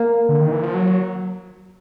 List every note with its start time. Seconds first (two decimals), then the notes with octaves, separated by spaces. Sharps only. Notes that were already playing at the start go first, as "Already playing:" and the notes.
Already playing: A#3
0.29 D3
0.41 D#3
0.52 E3
0.63 F3
0.74 F#3